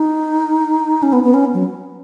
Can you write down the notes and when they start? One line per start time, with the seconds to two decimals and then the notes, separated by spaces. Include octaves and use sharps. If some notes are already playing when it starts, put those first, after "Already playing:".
Already playing: D#4
1.03 C#4
1.13 B3
1.24 B3
1.34 C#4
1.54 F#3